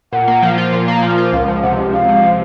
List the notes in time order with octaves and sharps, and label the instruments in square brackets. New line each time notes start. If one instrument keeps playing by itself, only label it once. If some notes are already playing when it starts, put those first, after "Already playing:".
[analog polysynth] A#2 [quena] F#5
[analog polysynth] A#3
F3
F4
A#2
A#3
F3
F4
[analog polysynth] C#2 [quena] F5
[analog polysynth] F3
[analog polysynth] C3 [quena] F#5
[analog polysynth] C#2
[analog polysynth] C#2 [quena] F5
[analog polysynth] F3
C3